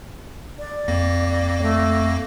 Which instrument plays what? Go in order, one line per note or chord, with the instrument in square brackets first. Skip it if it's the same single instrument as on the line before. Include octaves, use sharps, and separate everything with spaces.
[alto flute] D5
[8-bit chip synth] F2 A#3 A#6
[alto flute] A3